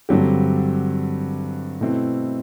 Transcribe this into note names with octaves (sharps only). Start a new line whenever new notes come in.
G2 D3 F#3 C4 G4
B2 A3 C4 E4 A4